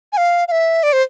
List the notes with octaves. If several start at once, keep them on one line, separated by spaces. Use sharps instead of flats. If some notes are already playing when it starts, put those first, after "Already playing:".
G#5
F5
F5
E5
D5
C5